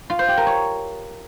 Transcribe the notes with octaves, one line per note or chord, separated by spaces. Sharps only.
F4
C5
G4
A#4
C#5